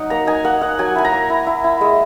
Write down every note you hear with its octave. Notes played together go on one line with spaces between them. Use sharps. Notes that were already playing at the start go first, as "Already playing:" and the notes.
Already playing: F#3 D#4 F#5
A#3 A#5
D#4 G#5
A#3 F#5
D#4 F#5
F#3 G#5
E4 G#5
A#5
A#3
E4
E4
E4
G#3